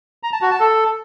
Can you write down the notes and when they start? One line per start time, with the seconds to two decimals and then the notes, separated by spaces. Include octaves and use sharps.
0.23 A#5
0.32 A5
0.42 F#4
0.51 A5
0.60 A4